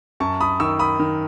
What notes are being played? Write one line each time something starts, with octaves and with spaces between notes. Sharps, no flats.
F#2 A5 C#6
B5 D#6
D#3 C#6 E6
B5 D#6
D#3